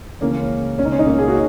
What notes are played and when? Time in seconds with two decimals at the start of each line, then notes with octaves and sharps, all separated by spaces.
0.21 C#2 C#3 E3 A#3 C#4
0.78 C#2 B2 C#4
0.85 D#4
0.92 C#4
0.99 D#4
1.06 A#3 C#4
1.19 G#4
1.28 F#4